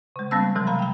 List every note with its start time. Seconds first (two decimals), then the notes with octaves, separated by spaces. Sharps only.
0.16 C#3 G#3
0.31 G3 A#3 B3 C#4 A5 E6
0.55 C3 E3 F#3 G#3
0.67 F5 A#5 B5
0.79 G5 A#5